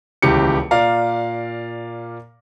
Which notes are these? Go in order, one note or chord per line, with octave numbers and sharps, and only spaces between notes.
D#1 C#2 E3 G4 C#7
A#2 D5 F5 A#5